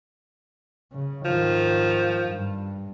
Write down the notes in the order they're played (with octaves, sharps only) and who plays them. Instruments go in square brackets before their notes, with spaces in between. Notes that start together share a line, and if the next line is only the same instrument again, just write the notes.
[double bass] C#3
[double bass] G#2 D#3 [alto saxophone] F3
[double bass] G2